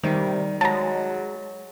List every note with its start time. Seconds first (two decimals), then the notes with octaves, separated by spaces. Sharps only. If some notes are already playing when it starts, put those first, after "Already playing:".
0.03 C3 D#3 G3
0.61 F#3 G#3 A5 A#5